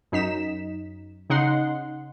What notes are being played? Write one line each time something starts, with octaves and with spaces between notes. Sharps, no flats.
F#2 D#4 B6 E7
C#3 D#4 F#5 C6